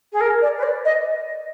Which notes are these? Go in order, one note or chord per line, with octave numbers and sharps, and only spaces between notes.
G#4
A#4
D5
B4
D5
D#5